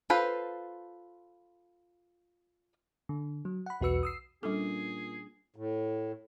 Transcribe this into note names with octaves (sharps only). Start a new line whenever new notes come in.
F4 A4 B4 C5
D3
F#3
F#5 B5
B1 E2 F#4 B4 E6 C#7
D#6 E6 C7
A#2 G3 C#4 D4 G#4 A4
A2